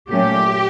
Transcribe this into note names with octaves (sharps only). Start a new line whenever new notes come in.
A#2 F#3 A3 C#4 G4